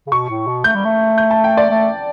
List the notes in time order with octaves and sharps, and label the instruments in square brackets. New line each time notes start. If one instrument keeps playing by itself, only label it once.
[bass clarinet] C#3
[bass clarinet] B2 [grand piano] C#6
[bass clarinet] A2
B2
[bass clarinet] A3 [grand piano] G6
[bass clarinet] G3
A3
[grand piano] G6
A5
G5
D5
[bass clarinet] A3